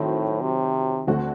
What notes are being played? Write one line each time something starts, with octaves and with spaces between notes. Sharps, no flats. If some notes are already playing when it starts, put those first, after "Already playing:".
Already playing: A2 D#3 F#3 C4
C3
D2 D3 A3 C4 F#4